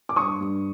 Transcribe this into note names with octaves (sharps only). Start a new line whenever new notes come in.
D6
G2 C#6 D#6
G2